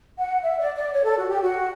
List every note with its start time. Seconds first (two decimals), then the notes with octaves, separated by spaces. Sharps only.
0.18 F#5
0.42 E5
0.59 D5
0.75 D5
0.93 C#5
1.04 A4
1.17 F#4
1.29 G4
1.42 F#4